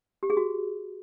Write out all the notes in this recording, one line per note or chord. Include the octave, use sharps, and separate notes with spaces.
G4
G#4
F#4